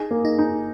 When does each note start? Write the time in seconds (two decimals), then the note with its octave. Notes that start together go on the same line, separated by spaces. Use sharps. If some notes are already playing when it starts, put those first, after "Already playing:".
Already playing: D#4 G#4
0.11 A#3
0.25 D#4
0.38 D#4